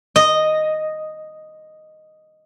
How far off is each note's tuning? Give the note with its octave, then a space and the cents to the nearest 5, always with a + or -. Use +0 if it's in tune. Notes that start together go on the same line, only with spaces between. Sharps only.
D#5 -5